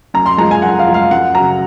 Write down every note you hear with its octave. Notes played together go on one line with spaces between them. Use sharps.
F#2 A#5
C6
F3 G#3 A#5
G#5
F#2 F#5
F5
F3 G#3
F5
F#2 F#5
C#3 F#3 A#5